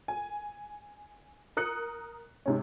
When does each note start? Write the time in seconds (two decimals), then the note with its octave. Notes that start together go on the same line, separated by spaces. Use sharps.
0.08 G#5
1.57 A#4 D#6 F#6 C#7
2.46 G#2 C3 C#4